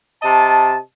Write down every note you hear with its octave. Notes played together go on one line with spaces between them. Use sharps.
C3 D#5 A5